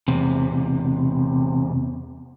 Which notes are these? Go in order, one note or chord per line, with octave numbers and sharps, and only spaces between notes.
E2 C3